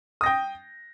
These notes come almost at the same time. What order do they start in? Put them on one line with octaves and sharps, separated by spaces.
D#6 A#6 G5